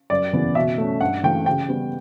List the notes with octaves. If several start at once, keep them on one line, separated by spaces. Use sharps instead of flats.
F#2 D5
C#3 E3 B3
B2 E5
A3 C#4
G2 F#5
E3 A3 G5
C#3 G5
G3 B3